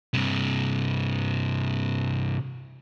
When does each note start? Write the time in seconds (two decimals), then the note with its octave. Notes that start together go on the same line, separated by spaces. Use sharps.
0.14 G2 C3